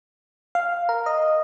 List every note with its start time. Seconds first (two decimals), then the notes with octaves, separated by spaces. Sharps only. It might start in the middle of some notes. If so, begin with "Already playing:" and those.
0.55 F5
0.89 A#4
1.06 D#5